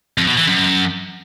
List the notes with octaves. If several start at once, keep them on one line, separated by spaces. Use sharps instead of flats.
F2
B2
E3
F#2